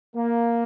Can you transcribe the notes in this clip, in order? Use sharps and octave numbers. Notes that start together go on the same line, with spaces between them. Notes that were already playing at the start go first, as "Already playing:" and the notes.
A#3